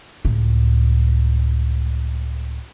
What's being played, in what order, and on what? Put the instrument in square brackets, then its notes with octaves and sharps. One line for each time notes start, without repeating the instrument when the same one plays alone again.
[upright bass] C#2 A2